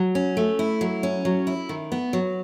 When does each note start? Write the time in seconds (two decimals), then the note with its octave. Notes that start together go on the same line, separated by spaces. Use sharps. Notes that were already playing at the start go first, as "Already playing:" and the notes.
Already playing: F#3
0.15 C#4
0.37 A3
0.59 E4
0.81 F#3
1.03 C#4
1.25 F#3
1.47 E4
1.69 D#3
1.92 B3
2.13 F#3